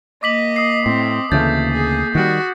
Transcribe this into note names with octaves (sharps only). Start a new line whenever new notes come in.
A#3 D#5 D6 B6 F#7
D#6 C7
A2 C4
D2 C#3 E3 A3 A#3 G6 A6
G#4
D#3 G3 F#4